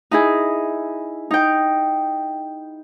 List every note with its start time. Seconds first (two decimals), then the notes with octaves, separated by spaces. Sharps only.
0.11 D#4 E4 G#4
1.31 D#4 G5